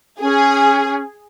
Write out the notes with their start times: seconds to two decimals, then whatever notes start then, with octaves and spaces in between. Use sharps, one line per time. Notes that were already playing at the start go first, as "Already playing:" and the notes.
0.21 C#4 G#4